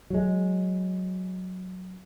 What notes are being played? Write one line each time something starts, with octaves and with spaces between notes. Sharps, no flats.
F#3 G#3